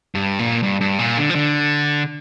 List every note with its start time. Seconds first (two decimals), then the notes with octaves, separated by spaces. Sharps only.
0.15 G2
0.39 A#2
0.63 G2
0.81 G2
0.99 A#2
1.17 D3
1.30 F3
1.35 D3